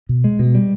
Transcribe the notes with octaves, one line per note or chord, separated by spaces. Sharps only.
B2
G#3
B2
G3